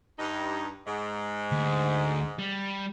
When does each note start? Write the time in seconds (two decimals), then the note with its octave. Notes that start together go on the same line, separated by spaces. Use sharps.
0.19 G2 D#4
0.87 G#2
1.52 D2
2.39 G3